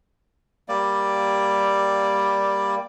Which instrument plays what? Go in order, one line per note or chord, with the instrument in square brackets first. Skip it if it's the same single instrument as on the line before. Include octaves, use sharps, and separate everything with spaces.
[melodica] G3 A#3 D5